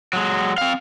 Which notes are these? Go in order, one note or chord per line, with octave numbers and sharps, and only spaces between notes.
F#3 G#3
C4 F5